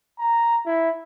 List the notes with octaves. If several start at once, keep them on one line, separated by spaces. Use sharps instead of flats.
A#5
E4